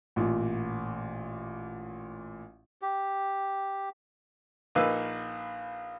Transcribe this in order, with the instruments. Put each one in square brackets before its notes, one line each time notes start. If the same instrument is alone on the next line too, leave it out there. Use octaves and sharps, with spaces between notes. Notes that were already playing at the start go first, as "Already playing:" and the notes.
[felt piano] A1 A#2
[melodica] G4
[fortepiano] A#1 A#3 D#4 B4 F5 E6